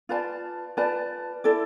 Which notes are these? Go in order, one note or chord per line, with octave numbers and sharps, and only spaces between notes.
F4 B4 D5 A5
F4 B4 D5 A5
E4 A4 D5